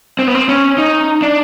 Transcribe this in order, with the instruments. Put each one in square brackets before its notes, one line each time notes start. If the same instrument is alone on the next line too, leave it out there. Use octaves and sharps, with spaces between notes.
[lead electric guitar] C4
B3
C4
C#4
D#4
D4